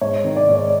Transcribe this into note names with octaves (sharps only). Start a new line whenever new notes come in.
G#2 C#5
D#3
D5
G#2
D5